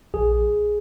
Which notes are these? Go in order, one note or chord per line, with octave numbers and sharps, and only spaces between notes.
A#1 G#4